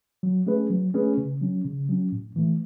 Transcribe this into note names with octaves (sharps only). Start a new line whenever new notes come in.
F#3
A3 C#4 G#4 B4
F#3
A3 C#4 G#4 B4
C#3
F#3 C#4
C#3
F#3 C#4
A2
E3 A3